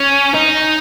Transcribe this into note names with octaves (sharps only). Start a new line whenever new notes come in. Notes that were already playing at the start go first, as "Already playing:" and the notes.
Already playing: C#4
D#4